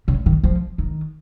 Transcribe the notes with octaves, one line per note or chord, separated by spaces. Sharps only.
C#3
D#3
F3
D#3